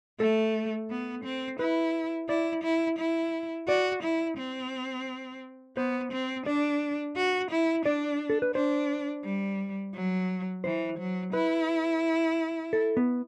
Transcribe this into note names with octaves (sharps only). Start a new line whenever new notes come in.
A3 A4
B3
C4
E4 B4
E4 D5
E4
E4
F#4 D5
E4
C4
B3 C5
C4
D4 D5
F#4
E4
D4 D5
A4
B4
D4 C5
G3
F#3
E3 C5
F#3
E4 B4
A4
B3